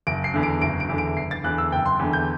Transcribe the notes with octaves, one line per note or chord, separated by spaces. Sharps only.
F#1 D7
C7
E2 D3
D7
F#1 D7
D7
E2 D3
D7
F#1 C7
A6
E2 D3 F#6
E6
F#1 G5
C6
E2 D3
G6